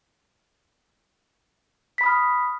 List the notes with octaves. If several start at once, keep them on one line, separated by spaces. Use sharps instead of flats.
B5 D#6 F6 B6